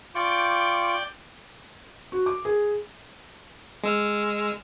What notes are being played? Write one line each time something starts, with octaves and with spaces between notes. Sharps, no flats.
F4 D5 G5 C#6 D6
F#4
D6
G#4
G#3 E6 F6